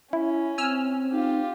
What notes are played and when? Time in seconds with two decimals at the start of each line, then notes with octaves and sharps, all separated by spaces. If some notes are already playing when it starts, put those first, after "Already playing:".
0.13 C#4 E4
0.58 C4 G#5 E6 F6
1.12 D#4 F4 G4